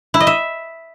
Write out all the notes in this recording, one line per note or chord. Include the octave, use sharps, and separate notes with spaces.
E4
D#5
E5